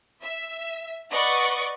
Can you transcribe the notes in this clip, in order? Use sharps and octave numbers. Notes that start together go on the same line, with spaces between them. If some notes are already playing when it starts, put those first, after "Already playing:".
E5
B4 D5 D#5 F#5 C#6